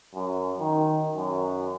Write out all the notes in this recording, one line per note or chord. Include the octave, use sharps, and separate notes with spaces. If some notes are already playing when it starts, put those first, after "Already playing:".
F#2
D#3
F#2